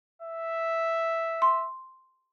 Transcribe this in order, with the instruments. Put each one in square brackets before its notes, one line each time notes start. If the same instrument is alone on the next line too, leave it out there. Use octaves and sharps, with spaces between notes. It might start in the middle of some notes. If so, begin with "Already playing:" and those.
[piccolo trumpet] E5
[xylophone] C6